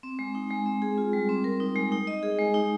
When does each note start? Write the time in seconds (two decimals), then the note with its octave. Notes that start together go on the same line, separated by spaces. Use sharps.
0.03 C4
0.19 G#3
0.35 D#4
0.50 G#3
0.66 C4
0.82 G#4
0.98 F4
1.13 G3
1.29 C4
1.44 A#4
1.60 D#4
1.76 G#3
1.92 D#4
2.07 D#5
2.23 G#4
2.39 G#3
2.54 D#4